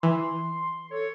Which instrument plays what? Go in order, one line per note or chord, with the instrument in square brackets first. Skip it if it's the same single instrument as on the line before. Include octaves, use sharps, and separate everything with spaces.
[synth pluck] E3 [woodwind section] C6
[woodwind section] A4 C#5